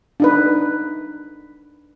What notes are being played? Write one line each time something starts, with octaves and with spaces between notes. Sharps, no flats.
D4 D#4 B4